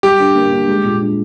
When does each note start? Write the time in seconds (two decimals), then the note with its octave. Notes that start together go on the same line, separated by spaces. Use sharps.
0.03 G3 G4
0.20 D3
0.35 A#3
0.52 D4
0.68 G#3
0.84 A#2
1.01 D4